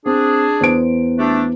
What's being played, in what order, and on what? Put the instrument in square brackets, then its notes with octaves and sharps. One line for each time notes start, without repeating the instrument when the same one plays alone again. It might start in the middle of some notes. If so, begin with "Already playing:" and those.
[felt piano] C4 [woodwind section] D4 G#4
[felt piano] E2 C5 D7
[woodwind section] A3 D4 G4